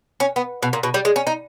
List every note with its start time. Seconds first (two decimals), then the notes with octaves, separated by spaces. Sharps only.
0.20 C#4
0.36 B3
0.63 B2
0.73 A#2
0.83 B2
0.94 G3
1.05 G#3
1.16 C#4
1.27 D#4